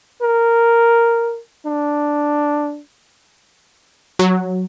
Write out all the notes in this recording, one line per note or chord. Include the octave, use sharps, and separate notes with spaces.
A#4
D4
F#3